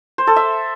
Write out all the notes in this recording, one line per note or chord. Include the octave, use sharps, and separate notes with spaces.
C5
A4
E5